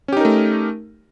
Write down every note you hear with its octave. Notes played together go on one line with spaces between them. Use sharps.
A3 C#4 D#4 G4 A#4